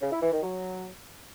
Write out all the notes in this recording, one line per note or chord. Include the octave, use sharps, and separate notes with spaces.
C#3
E4
E3
D#3
F#3